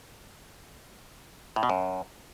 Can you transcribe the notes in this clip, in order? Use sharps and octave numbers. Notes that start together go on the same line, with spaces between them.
A2
B2
F#2